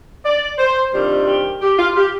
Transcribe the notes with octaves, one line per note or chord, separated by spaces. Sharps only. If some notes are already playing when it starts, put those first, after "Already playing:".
D5
C5
C3 D#3 G3 D4 F4 C5
G4
G4
F4
G4